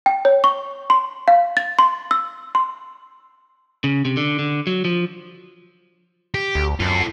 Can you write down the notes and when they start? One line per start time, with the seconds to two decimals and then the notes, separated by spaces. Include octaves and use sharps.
0.06 G5
0.25 C#5
0.44 C#6
0.90 C6
1.28 F5
1.57 A6
1.79 C6
2.11 E6
2.55 C6
3.84 C#3
4.05 C3
4.17 D3
4.39 D3
4.67 F#3
4.85 F3
6.35 G4
6.55 D2
6.80 F#2 F4 A4